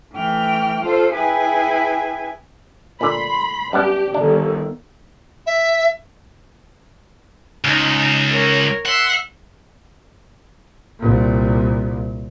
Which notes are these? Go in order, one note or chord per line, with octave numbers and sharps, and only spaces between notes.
E3 A3 G5 F6
F4 A4 C5
E4 G#4 B4 G5 G#5
A#2 D3 B5 C6
F#2 G3 B3 D4 G4
G1 D#3 D4
E5
C#2 D#4
A#4 C#5
E5 F#5 C6
C2 A#2